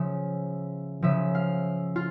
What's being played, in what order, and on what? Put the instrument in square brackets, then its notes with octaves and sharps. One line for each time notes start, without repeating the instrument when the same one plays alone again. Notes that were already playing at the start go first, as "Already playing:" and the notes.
Already playing: [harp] C#3 F3 E5
C#3 F3 E5
F5
F4